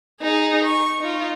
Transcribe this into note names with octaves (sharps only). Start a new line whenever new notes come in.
D#4 G#4
C#6
D#4 F4